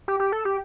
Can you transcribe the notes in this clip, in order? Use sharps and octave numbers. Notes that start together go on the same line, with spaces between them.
G4
G4
A4
G4